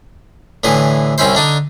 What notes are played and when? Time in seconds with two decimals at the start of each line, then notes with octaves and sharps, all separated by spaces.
0.64 A2 D3 E3 G#4
1.18 C2 C4 C#4 E4 C5
1.35 D3 D4 D#4